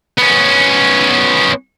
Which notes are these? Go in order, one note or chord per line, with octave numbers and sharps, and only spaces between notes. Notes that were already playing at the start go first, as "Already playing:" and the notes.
B3 C#4